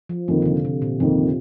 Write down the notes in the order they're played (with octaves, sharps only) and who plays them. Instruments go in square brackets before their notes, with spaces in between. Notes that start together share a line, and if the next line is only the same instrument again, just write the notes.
[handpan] F3
[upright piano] F2 D#3 A#3 [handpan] D3
[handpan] C3
D3
C3
A#2
[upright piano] F2 D#3 A#3 [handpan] C3